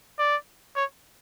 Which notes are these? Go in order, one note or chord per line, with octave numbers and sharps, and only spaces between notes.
D5
C#5